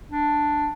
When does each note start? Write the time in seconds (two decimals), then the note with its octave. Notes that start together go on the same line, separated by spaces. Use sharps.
0.11 D4